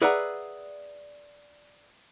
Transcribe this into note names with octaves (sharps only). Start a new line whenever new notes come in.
G#4 B4 D5 E5 F#5 A#5